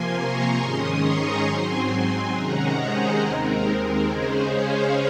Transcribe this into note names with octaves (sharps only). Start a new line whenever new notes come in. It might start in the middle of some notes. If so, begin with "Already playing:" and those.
Already playing: C3 F3 A#3 G#5 C6
A#5 C#6
G#2 D#3 G#3 C#4 C6 D#6
A#5 C#6
G#2 F#3 C4 G#5 C6
G#5 C6
C3 D#3 G#3 C#4 F#5 A#5
G#4 C5
D#2 D#3 G#3 C4 A#4
C#3 G#3 C#4 G#4 C5
C#5 F5